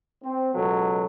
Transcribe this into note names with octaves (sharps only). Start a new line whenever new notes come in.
C4
C#2 B2 F#3 A4